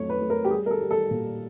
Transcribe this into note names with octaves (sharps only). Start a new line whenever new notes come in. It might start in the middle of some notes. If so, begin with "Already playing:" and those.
Already playing: F2 F#3 A3 C#5
B4
A3
A#4
G4
G3 G#4
A#4
A4
G3
A4
A#2